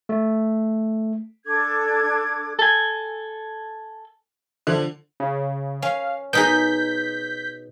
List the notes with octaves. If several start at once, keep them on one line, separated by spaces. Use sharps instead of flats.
A3
D4 A4 D6 G#6
A4 G#5
D3 F3
C#3
C#4 F5
B2 D#4 G#4 G6 B6